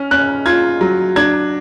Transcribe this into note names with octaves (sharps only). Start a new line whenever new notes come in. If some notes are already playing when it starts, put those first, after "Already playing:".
Already playing: C#4 F6
C#4 F#6
F4 G#6
F#3
D4 G#6